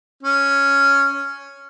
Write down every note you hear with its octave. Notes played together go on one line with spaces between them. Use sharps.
C#4